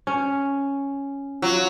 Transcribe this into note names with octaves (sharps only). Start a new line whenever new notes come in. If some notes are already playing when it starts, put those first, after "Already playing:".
C#4
F#3 F4